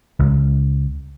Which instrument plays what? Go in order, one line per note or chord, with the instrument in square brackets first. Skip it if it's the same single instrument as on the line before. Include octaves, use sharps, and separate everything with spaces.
[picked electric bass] C#2